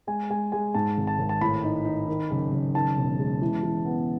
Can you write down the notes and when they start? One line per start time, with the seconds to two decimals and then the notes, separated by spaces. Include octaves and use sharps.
0.07 G#3 G#5
0.30 G#3 G#5
0.52 G#3 G#5
0.74 G#2 A5
0.97 G#1
1.07 A5
1.19 G#1
1.29 A5
1.41 A2 B5
1.64 D#4
1.85 D#4
2.08 D#3
2.31 F#1
2.52 F#1
2.75 D#3 A5
2.96 E1
3.19 G#3
3.42 E3
3.63 E3
3.85 B3